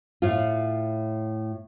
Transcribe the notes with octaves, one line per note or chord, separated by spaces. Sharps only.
A2 F4